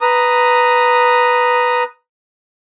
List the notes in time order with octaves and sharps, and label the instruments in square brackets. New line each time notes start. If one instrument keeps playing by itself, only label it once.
[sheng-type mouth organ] B4 A#5 D#6